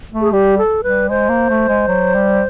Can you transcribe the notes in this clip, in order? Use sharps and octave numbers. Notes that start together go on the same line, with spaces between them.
A3
G#4
G3 G4
A4
G3 B4
G#3 C5
A#3
A3
G#3
F#3
G3